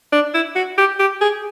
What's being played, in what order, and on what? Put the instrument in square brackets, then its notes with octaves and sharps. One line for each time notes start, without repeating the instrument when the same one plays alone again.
[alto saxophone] D4
E4
F#4
G4
G4
G#4